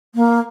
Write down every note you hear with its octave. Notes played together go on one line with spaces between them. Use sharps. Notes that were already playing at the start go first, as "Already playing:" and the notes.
A#3